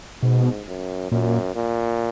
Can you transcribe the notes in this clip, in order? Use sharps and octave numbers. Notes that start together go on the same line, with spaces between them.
G#2 B2
F#2
F#2 A#2
A#2